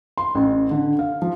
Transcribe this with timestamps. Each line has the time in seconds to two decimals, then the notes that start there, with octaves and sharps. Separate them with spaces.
0.18 C6
0.35 A1
0.71 D3
0.99 F5
1.22 F3